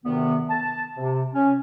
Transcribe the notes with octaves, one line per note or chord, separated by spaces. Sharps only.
D2 C3 D#3 B3
A5
C3
C#4